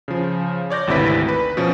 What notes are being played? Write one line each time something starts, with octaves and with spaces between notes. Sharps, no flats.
C#3 F3
C#5 D5 G6 A#6
G#1 D2 C3 E4 B4 B6
B4
B2 F3 C#4